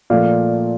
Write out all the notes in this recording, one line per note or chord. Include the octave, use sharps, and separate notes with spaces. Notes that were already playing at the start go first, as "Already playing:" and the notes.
A#2 F3 A3 D5 F5